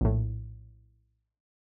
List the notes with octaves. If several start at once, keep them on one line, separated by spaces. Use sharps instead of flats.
A#1 A2